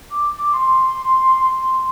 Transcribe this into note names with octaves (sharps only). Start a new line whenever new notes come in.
D6
D6
C6